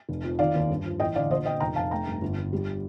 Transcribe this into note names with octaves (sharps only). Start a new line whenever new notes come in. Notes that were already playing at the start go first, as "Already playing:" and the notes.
F1
F2
D#3 D5 F5
D#2
G2
F3
A1 D#5 G5
D3 D5 F5
A#1 C5 D#5
A#1 D#5 G5
F1 G5 A#5
F1 F5 A5
A3 G5 A#5
G2
G1
G1
G3